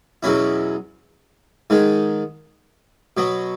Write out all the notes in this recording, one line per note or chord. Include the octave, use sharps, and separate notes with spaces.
E2 B2 F#3 C#4 E4
G#2 D#3 G#3
B2 F#3 B3